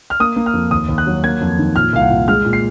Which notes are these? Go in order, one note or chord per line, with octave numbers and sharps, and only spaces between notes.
F6
A#3 D#6
A#3
F6
F2
D#2 D#6
D#2
F#6
F#3
A#3 G#6
F2
D#3
A#2 F6
C2 F5
F#5
A#2
G#3 F6
A#2
C7